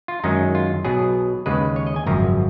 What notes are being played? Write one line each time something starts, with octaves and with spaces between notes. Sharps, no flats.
F4
F#2 D#3 G#3 C#4 D#4
F4
B1 B2 F#3 G#4
D#2 C#3 G#3 B4
C#5
D#5
G#5
G#1 F#2 C#3 F3 A#5